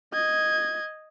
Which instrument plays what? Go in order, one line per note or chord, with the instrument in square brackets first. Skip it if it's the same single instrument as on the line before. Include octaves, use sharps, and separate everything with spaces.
[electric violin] D#5 G#6